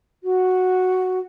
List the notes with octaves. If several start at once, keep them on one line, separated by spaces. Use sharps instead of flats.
F#4